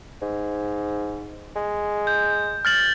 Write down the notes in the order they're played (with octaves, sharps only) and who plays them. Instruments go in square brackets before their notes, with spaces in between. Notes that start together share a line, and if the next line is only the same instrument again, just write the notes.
[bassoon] G#2
G#3
[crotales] G6
F6 A6 F#7